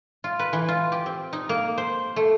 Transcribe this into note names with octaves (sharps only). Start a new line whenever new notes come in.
F4
B4
E3
F4
G4
C4
D#4
A#3
C5
A3